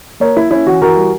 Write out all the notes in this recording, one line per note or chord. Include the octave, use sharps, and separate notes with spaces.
A#3 A#4 C#5
A#3 E4
C#4 E4
E3 F#4
E3 F#4 A#4
G3